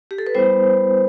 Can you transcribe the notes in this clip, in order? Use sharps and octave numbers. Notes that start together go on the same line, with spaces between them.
G4
A4
B4
G3 B3 E4 C5